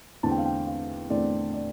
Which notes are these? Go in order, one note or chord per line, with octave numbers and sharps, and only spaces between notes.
E2 D3 A3 C4 A5
G5
F5
G5
F5
E2 D3 A3 C4 D5
D5